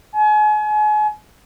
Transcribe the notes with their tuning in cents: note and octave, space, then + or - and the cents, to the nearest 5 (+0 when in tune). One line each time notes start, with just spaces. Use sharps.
G#5 +35